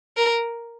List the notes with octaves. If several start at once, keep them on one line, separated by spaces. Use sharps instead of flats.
A#4